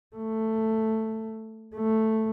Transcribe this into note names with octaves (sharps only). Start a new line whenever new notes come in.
A3
A3